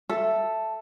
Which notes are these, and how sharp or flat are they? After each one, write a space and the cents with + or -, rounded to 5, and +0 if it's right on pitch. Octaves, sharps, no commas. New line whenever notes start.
A4 +0 E5 +5